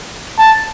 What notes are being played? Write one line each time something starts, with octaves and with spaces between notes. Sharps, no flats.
A5